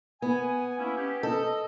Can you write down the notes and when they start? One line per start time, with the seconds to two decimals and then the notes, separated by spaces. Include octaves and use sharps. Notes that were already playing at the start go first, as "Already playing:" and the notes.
0.22 B3 G#5
0.79 A#3 C#4 E4
0.96 C#4 G4
1.23 A4 D#5